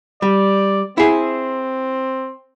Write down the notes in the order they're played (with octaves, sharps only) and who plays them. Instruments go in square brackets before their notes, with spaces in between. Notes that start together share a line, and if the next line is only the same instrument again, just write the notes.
[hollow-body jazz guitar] G3 [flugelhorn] D5
[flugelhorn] C4 [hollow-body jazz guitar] E4 G#4